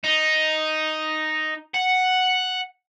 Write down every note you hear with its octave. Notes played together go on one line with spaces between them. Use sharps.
D#4
F#5